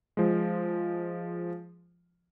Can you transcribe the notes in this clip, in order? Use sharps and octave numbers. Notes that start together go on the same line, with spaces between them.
F3 G#3